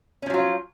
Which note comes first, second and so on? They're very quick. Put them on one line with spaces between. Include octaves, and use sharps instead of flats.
C#4 F3 F#3 F4